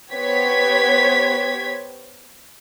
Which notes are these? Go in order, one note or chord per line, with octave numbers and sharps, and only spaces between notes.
B3 G4 C5 C#5 G#6 B6